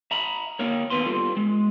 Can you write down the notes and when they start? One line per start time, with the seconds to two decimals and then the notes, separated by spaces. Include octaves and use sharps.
0.11 E5 A#5 B5
0.59 A#3 A#4 C#5
0.90 D#2 A#2 B3 B4 C6
1.06 G3 F4 A4
1.37 G#3